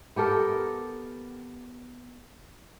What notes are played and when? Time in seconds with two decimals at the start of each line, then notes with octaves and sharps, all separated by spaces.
0.16 B3 G4 A4 A#4